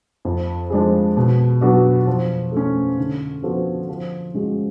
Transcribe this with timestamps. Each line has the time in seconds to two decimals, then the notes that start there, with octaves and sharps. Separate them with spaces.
0.25 F2
0.70 F3 G#3 D4 G#4
1.17 B2
1.61 F#3 B3 D4 F#4
2.07 F3
2.52 A3 C#4
2.98 D3
3.43 F3 B3 F#4 A4
3.89 F3
4.34 G#3 C#4 F#4